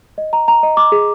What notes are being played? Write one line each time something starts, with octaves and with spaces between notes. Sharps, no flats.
D#5
A#5
A#5
D#5
D6
G#4